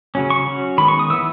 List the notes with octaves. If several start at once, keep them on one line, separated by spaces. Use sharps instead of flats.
C#3 F#3 C#4
C#6
F#3 C#4
D#3 G#3 B3 B5
C#6
D#6
E3 B3 E6